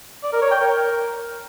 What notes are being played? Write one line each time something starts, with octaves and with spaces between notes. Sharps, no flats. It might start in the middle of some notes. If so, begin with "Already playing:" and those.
D5
A#4
C#5
G5
A#4